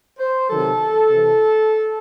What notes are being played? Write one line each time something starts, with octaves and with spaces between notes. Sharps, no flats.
C5
C3 D#3 F#3 A4
C3 E3